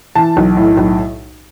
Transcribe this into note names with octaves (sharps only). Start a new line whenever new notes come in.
E3 A5
B1
A2
B1